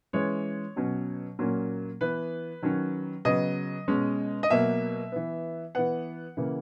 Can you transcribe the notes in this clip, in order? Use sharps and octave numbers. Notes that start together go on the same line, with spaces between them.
E3 G#3 C#4 C#5
B2 F#3 C#4
A#2 F#3 A#3 C#4
E3 B3 B4
D#3 F#3 C#4
C#3 F#3 B3 D#5
B2 G#3 C#4
D#5
B2 F#3 A#3 E5
E3 B3
E3 B3 F#5
C#3 E3 A#3